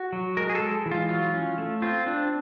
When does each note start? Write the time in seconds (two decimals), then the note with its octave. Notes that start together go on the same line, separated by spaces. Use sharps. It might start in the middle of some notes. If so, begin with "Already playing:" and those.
Already playing: F#4
0.13 F#3
0.37 G#3 A#4
0.49 G#4
0.55 A4
0.61 G#3
0.86 E3
0.91 F4
1.09 F#3 F4
1.34 C#4
1.58 A3
1.82 C4 F4
2.06 C4 D4